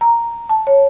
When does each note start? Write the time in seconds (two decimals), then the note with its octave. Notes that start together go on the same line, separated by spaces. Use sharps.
0.01 A#5
0.49 A5
0.67 C#5